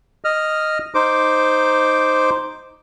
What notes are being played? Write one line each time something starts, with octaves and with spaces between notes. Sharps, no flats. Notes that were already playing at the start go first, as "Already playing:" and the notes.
D#5 F6
D#4 C5 D6